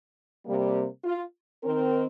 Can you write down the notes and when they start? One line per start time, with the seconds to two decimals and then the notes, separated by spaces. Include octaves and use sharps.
0.45 C3 G3 A#3
1.04 F4
1.63 D#3 C4 A#4